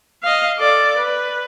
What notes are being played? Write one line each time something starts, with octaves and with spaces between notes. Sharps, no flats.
D#5 F5
A4 D5
B4